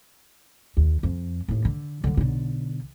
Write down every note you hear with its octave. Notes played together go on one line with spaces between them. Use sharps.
D#2
F2
D#2 A2
D3
D3 F#3
B1 D3